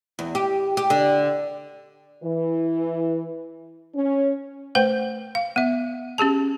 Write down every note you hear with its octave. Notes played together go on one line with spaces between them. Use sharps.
E2
G4
G4
D3
E3
C#4
A3 B4 C5 G5
F5
B3 E5
C#4 G4 G#4 A5